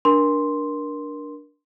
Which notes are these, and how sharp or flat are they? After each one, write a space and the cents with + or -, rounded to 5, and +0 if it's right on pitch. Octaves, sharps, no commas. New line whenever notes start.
D4 +0 A#4 +25 C6 +0